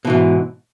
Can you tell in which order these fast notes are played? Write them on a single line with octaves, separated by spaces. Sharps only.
B2 E3 G#2